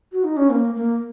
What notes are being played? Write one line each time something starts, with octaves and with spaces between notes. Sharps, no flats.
F#4
D#4
C#4
A#3
A#3